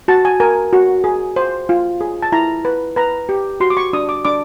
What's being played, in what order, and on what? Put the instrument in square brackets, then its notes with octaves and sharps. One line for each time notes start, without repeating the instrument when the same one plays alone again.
[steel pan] F#4 A5
G#5
A#4 G#5
F#4
G#4
C5
F4
G#4
A5
E4 A#5
B4
B4 A#5
G4
F#4 C6
D6
C#6
D4 D#6
D6
D4 D6